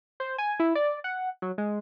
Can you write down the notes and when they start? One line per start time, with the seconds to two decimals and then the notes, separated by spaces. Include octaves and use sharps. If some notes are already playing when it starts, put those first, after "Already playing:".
0.20 C5
0.38 G#5
0.60 E4
0.75 D5
1.04 F#5
1.42 F#3
1.58 G#3